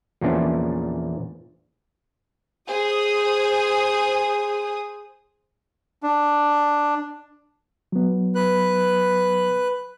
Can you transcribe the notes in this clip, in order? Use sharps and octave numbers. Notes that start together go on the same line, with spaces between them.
E2 A#2 E3 F3 C#4 D4
G#4 C5 D#6
D4
F#3 B3
B4 F#6